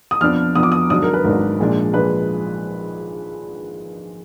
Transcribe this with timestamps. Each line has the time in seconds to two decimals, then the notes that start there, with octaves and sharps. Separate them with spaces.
0.11 D#6
0.21 F2 F3 B3 D4 F6
0.55 F2 F3 B3 D4 D#6
0.63 D6
0.72 D#6
0.90 G#1 G#2 F#3 D4 D#6
1.03 A#4
1.14 B4
1.24 G#1 G#2 F#3 D4 A#4
1.59 A#1 A#2 G#3 D4
1.93 A#1 A#2 G#3 D4 B4